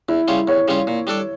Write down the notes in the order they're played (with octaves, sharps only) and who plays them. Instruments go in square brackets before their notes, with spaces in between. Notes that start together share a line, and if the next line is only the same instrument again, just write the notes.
[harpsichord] E2 [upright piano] E4
[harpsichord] C#3 G3 C#4 F4
[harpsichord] E2 [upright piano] C#5
[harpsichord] C#3 G3 C#4 F4
A#2
G3 D4 A4 D5